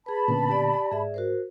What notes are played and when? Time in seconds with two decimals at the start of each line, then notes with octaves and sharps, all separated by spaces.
0.06 G#4 B4 A5 B5
0.28 A#2 D3 B3 C#4 B4
0.49 G4 D5
0.92 G#2 G#4 D5 E5
1.14 F#4 A#4 C5